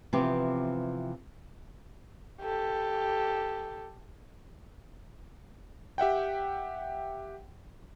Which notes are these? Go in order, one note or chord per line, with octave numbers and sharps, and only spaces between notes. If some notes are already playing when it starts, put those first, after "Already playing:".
C3 E3 F3 B3 C4 G4
G4 A4
G4 E5 F#5 G5